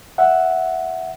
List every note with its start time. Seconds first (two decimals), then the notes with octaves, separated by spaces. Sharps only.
0.18 E5 F#5